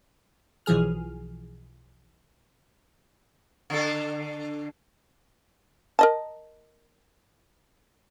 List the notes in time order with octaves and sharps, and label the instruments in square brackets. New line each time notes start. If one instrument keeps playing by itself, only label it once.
[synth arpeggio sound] B1 E3 F3 G#4 F6
[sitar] D3 A4
[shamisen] A#4 D#5 A5